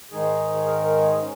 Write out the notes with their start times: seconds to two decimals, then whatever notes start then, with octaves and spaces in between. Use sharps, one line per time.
0.12 G#2 D#3 G#3 D#4 G#4
0.55 G#4
0.65 A#4
0.84 A#4
1.02 G#4
1.20 C#4